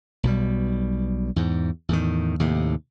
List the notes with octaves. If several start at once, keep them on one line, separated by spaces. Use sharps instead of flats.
B1 B2 G3
E2 G#2
E2 A2 D#3
D#2 A2 C3